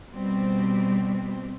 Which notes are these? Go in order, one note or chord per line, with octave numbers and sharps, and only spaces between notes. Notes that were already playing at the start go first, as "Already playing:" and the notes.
B2 G3 C4